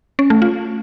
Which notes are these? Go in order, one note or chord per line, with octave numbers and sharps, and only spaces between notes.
C#4
A3
F4